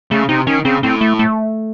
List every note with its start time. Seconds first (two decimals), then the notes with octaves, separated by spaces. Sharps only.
0.11 C#3 A3
0.29 C3 D#4
0.47 D#3 C#4
0.65 C#3 C4
0.83 A2 C4
1.01 A3
1.19 A3